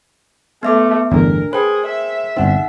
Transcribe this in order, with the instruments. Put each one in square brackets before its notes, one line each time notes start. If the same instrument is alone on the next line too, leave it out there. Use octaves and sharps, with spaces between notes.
[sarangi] A3 [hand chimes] B3 E5 D6
[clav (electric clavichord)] G1 E2 A2 [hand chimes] D4 [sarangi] A#4
[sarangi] G#4 [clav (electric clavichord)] B4 [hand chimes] C5 G5
[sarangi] E5
[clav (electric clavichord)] G1 C4 [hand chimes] D#4 F#5